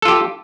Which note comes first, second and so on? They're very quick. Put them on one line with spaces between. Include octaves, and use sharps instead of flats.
A4 F4 G4